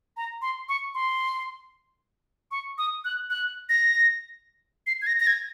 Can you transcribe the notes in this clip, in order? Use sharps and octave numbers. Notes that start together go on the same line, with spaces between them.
A#5
C6
C#6
C6
C#6
D#6
F#6
F#6
A#6
C7
G#6
A#6
A#6
G#6